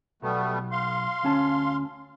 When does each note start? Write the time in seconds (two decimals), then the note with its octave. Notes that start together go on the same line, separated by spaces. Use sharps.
0.22 B1 G3 A3 B3
0.72 F5 C6
1.23 D2 C#4 A5